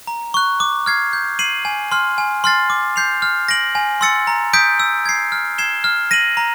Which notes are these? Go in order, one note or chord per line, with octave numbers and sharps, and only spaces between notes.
A#5
C#6 F#6
D6
F6 G#6 C7
G6
C7 D#7 F#7
G#5
C6 F6
G#5
C6 F6 A6 C7
D6
G6 C7 F7
F6
A#6 D7 F#7
G#5
C6 E6 A6 C#7
A#5
D#6 G6 B6 D7
E6
G#6 C7
F6
G#6 C7 E7 G7
F6
A#6 D#7 F#7
A#5